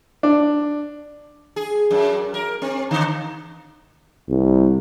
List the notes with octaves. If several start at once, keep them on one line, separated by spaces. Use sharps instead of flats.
D4
G#4
F#2
A#4
C4
D3
C2